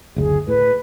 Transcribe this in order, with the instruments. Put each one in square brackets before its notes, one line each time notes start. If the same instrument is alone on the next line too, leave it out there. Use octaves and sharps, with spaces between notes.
[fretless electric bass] F#1 D2 [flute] G#4
[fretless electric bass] A2 [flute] B4